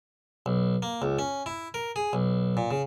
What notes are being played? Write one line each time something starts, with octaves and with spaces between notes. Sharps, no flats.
B1
A#3
C#2
C#4
E4
A#4
G#4
B1
A#2
C#3